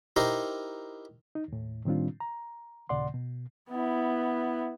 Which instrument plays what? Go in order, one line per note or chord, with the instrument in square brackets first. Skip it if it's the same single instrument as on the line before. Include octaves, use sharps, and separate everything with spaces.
[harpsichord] D#4 E4 G4 A#4 C5
[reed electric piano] D#4
D#2 A2
A2 D#3 G3 C4 D4 F4
A#5
D#2 A#2 C#3 D5 F#5 C6
B2
[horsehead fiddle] B3 E4